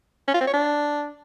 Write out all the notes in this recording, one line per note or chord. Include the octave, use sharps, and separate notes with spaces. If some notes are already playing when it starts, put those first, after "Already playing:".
C#4
F4
C4
C#5
D4